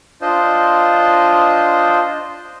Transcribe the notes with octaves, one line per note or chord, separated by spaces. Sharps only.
D4 F4 C5 D#5